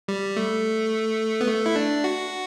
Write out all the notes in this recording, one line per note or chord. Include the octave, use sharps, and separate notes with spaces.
G3
A3
B3
A3
E4
D4
F#4